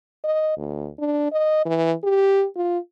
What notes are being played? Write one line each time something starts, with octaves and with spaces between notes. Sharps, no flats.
D#5
D2
D4
D#5
E3
G4
F4